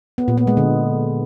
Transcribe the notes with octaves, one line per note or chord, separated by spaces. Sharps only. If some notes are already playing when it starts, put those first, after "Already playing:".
B3
A#2
B3
G#3
D3